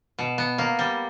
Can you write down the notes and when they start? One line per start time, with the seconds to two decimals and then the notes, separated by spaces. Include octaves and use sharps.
0.19 B2
0.38 B3
0.58 A#3
0.79 G3